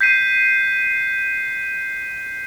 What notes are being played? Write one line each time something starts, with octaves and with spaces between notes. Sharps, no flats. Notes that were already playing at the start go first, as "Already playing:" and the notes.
G6 B6 C7 D#7